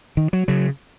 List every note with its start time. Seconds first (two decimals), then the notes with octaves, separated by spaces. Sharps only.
0.17 D#3
0.33 F#3
0.48 C#3 F#3